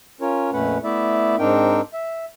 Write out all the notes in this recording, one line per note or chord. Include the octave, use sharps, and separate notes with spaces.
C#4 F4 A#4 C#5
F2 A#2 A3 C#4 B4 F#5
A3 B3 E4 D5 E5
G#2 C4 D4 D#4 A#4 G5
E5